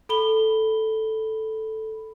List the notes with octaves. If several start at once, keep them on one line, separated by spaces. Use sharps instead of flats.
A4 B5 G7